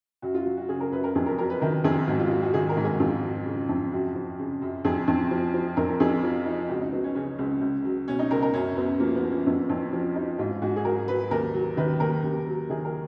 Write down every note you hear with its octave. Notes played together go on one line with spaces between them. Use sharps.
F#2 F#4
F4
F#3
F#4
C#3 G#4
A#4
F#2 B4
A#4
F2 G#4
A#4
F#3 A#4
B4
D#3 A#4
F2 G#4
G#2 F#4
F4
F#3 F#4
F#4
D#3 G#4
A#4
G#2
G#4
F2 F4
F#3
C#3
F2
F#2 F#4
F3
C#3
F#2
F2 G#4
F2
F3
F3
F2 A#4
A#4
F2 G#4
F3 F4
F3 D#4
C#2 F#4
D#4
F#3 B3
C#4
C#3 C#4
C#2
C#2
F#3
B2 C#4
D#4
C#2 A#4
A#4
F#2 C#4
F#2 B3
F3 A#3
B3
F3
C#4
F2 B3
F2 C#4
F3 C#4
F3 D#4
G#2 F4
G#2 F#4
G#4
F#3 A#4
F#3 B4
D#2 A#4
F#3
D#3 B4
D#2 A#4
D#2
F#3
D#3 G#4
A#4